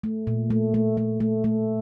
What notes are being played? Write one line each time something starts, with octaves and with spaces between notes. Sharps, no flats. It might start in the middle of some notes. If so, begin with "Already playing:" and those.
A3
A#2
A3
A3
A3
A3
A3